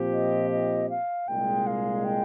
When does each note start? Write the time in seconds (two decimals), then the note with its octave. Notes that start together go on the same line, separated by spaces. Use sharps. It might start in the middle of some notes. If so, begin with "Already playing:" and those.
Already playing: A#2 F3 C4 G4
0.12 D#5
0.51 D#5
0.90 F5
1.28 C2 A#2 G#3 G5
1.67 F5
2.04 G5